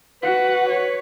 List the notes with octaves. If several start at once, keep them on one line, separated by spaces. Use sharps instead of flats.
F#4 B4 F#5
C#5